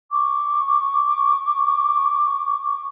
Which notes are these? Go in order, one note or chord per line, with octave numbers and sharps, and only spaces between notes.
C#6 D6